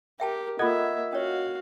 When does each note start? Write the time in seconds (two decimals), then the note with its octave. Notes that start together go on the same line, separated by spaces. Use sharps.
0.20 G4 A#4 E5 G5 A5
0.59 A#3 F4 A4 D#5 E5 F#5 G#6
1.13 C#4 F#4 C#5 F5